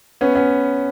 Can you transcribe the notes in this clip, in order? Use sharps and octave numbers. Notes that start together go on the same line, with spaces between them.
B3 C#4
B3 C#4